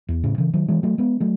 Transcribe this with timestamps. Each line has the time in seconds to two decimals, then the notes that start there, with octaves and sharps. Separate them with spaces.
0.09 E2
0.24 A2 C#3
0.38 C#3 E3
0.53 D#3 F#3
0.68 E3 G#3
0.83 F#3 A3
0.98 G#3 B3
1.20 F#3 A3